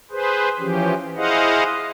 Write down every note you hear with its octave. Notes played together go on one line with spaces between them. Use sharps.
G#4 B4 C5
E3 F3 C#4 G4
E4 G#4 C5 D#5 F5 F#5